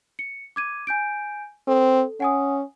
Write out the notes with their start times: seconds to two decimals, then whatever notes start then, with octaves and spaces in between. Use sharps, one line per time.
0.19 C#7
0.56 D6 G#6 D#7
0.87 G#5 G6 D7
1.68 C4 A4
2.20 C#4 F#5 G#5 D#6